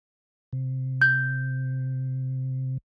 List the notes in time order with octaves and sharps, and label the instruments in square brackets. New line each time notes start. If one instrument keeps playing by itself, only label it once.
[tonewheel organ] C3
[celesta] G6